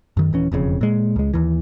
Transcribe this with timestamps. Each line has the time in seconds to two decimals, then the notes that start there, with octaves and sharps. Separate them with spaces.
0.17 F#2 D#3
0.33 D#1 E3 C#4
0.52 E1 F2 G#2 C#3
0.81 A#2 G#3
1.16 C#2 G#3
1.34 D#2 E3